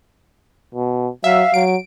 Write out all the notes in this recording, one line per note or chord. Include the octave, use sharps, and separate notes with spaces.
B2
F#3 E5 F5
F#3 D7